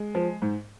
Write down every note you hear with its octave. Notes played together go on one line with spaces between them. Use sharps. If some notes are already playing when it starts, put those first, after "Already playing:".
Already playing: G#3
F3
G#2